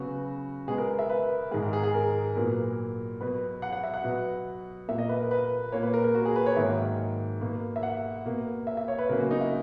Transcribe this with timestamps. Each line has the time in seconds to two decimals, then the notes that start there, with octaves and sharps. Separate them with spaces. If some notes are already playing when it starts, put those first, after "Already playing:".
Already playing: C#3 F#3 B3 F#4
0.67 B2 G#3 B3 G#4
0.78 A#4
0.99 E5
1.09 B4
1.51 G#2 D#3 G#3 G#4
1.62 A#4
1.73 G#4
1.83 G#4
1.94 A#4
2.36 A#2 F#3 B3 A#4
3.21 B2 F#3 B3 B4
3.62 F#5
3.72 F#5
3.83 E5
3.94 F#5
4.04 B2 F#3 B3
4.88 A#2 A#3 E5
4.98 D#5
5.09 B4
5.20 A#4
5.31 B4
5.72 A#2 A#3 C#5
5.83 B4
5.94 A#4
6.04 A#4
6.14 F#4
6.25 G#4
6.36 B4
6.46 C#5
6.56 G#2 D#3 F#3 A#3 E5
7.41 B2 A#3
7.76 E5
7.83 F#5
8.25 B2 A#3
8.67 E5
8.77 E5
8.88 C#5
8.99 B4
9.09 C#3 F#3 A#3 A#4
9.20 F#4
9.31 D#4
9.41 E4